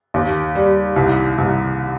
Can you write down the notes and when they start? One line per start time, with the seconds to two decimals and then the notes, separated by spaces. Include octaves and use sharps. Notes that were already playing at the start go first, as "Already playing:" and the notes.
0.14 D#2
0.55 G3
0.96 C2
1.38 C2